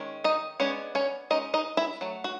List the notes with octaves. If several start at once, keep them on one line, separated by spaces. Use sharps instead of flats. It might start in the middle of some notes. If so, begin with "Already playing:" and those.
Already playing: D#3 G#3 C#4
D#4 D#5
G#3 B3 C#4 D4 C#5
C#4 C#5
G#3 C#4 D#4 D#5
D#4 D#5
E4 E5
F#3 A3
F#4